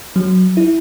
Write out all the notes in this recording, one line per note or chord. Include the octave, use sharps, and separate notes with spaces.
F#3
E4